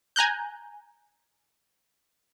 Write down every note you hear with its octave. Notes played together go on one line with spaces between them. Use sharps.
G#5 A#5 F#6 G6